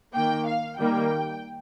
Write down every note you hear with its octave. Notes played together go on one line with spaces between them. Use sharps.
D#3 A#3 G5
F5
D#3 G3 A#3 G5